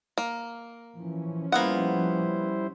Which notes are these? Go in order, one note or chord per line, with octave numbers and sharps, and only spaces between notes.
A#3
E3 F3 C#4
G3 A#3 B3 E4 C5 F#5